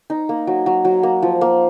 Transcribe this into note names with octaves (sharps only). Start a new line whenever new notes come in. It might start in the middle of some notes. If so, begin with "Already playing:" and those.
D#4
A#3
F#3
F#3
F#3
A#3
F3
A#3